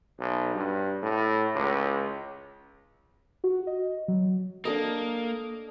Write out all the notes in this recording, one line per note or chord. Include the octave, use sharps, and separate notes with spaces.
B1
G2
A2
C#2
F#4
D#5
F#3
A#3 D4 A4 D#5